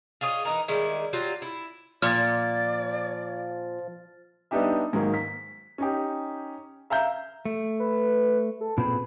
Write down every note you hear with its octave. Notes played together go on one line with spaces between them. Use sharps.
F4 G#4 C#5 D#5
E3 D#4 A#4
D#3 G3 G#3 E4
F#3 G3 F4
E4
A#2 F3 D5 F6 A6
G3 B3 D4 D#4 G4 E5
G#2 D#3 F#3 A#3
B6
C#4 D#4 G4
E5 F5 A#5 G6
A3
B4
A4
A#2 C4 G#4 B4